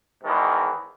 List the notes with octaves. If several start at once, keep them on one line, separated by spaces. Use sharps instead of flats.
E2 G#2 B2 D#3 E3